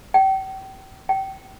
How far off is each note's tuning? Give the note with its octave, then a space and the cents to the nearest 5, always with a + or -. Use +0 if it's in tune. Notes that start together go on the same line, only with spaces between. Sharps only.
G5 -35
G5 -25